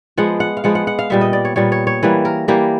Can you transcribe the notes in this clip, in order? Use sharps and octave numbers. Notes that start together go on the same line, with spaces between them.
F3 G#3 B3 F#5
F#5
F5
F3 G#3 B3 F#5
F#5
F#5
F5
A#2 G3 B3 E5
D#5
D5
C#5
A#2 G3 B3 C#5
C#5
C#5
E3 G3 A#3 B4
A#4
E3 G3 A#3 G4